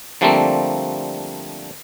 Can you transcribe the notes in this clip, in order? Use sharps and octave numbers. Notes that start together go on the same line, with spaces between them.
D3 F3 G3 A3 A#3 C4